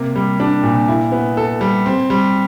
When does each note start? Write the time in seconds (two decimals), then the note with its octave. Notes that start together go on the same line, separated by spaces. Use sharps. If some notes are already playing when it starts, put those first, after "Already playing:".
Already playing: C3 A#3
0.16 G3
0.40 D4
0.63 A#2
0.88 E4
1.12 B3
1.37 A4
1.61 G3
1.86 C4
2.10 G3